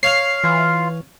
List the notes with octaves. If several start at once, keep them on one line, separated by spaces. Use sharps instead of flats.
C#5 F5 F6 C7
E3 F4